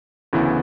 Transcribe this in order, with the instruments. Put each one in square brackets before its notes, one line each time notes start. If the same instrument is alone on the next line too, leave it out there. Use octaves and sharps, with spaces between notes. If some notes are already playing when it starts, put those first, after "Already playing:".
[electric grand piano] D2 C#3 E3 B3 E4